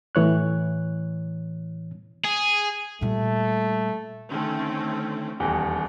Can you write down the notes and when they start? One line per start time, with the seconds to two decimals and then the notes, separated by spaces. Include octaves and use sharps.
0.15 A2 E3 C#5 F#6
2.25 G#4
3.01 A#2 G3 A3
4.31 D3 D#3 A3 C4 C#4
5.40 D#1 E2 G4